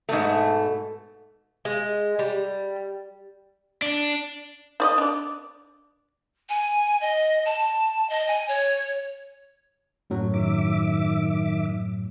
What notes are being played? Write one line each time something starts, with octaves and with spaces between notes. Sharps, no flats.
G#2 B2 A3
G#3
G3
D4
D#4 D5 D#5
D4 D5
G#5
D#5
A5
D#5
G#5
C#5
F#2 A2 F#3
D#3 E5 D6